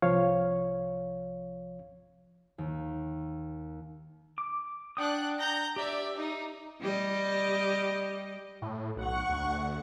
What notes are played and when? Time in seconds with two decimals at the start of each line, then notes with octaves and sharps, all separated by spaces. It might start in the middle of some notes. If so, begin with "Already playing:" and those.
0.02 C2 F3 C#5 F5
2.58 D#2
4.38 D6
4.97 D4 F#5 G5 D#6 F#6
5.38 A#5 G6 A#6
5.76 G4 D5 E5
6.15 D#4
6.81 G3 G4 D#5
8.62 A2
8.96 B1 F#5 C#6
9.29 D2